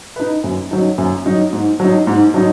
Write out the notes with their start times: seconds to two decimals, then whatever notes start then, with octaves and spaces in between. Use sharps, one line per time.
0.16 D#4 B4
0.44 F#2
0.71 F#3 D#4
0.98 F#2
1.26 F#3 D#4
1.53 G#2
1.80 F#3 D#4
2.07 G#2
2.34 F#3 D#4